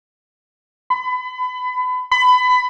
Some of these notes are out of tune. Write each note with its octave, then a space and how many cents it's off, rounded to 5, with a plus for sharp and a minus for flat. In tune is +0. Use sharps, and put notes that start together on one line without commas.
B5 +30
B5 +25